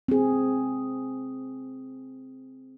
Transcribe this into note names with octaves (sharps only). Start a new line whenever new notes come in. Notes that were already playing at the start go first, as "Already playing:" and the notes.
C4 G#4